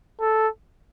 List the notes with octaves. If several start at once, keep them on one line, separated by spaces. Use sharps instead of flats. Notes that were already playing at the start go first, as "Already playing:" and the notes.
A4